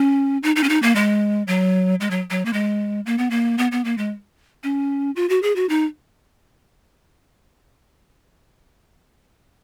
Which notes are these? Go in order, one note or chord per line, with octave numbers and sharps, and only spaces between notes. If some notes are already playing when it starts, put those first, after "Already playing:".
Already playing: C#4
D#4
D#4
C#4
D#4
A#3
G#3
F#3
G#3
F#3
F#3
A#3
G#3
A#3
B3
A#3
B3
B3
A#3
G#3
C#4
F4
F#4
G#4
F#4
D#4